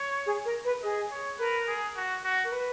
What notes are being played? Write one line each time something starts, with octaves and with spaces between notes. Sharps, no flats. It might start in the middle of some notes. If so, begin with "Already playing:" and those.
Already playing: C#5
G#4
A#4
B4
G#4 D#5
C#5
A#4 B4
G#4
F#4
F#4
A#4
B4